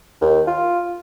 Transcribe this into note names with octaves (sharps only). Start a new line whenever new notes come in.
D#2
F4